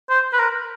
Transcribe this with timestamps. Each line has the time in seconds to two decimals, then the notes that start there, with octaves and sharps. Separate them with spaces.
0.10 C5
0.33 B4
0.39 A#4